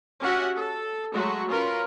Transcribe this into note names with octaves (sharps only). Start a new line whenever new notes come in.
C#4 F#4 G4 E5 F#5
A4
F#3 G#3 A3 F#4
C#4 F4 A#4 B4